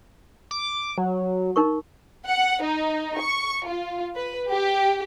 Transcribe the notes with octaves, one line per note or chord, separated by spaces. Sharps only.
D6
F#3
D#4 A#4 C#6
F#5
D#4
C#6
F4
B4
G4